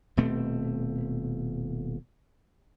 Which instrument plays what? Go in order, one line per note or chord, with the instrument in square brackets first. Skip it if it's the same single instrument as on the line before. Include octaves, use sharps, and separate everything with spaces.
[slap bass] D#1 B2 A3 C4